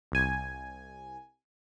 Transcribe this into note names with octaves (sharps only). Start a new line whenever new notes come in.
C2 G#5